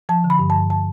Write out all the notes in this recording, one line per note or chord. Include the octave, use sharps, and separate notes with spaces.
F3 A5
D3
B5
G2
A5
G2
A5